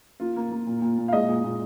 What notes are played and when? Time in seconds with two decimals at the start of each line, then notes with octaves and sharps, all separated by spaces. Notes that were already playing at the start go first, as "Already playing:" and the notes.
0.20 A#3 F4
0.36 A#3
0.51 A#3
0.67 A#2
0.82 A#2
0.98 A#2
1.08 F5
1.13 G#3 D#5
1.29 A#2
1.44 A#2